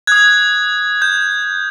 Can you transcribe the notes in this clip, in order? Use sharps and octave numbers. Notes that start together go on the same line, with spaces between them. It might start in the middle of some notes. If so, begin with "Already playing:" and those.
D#6 F#6 G#6
G6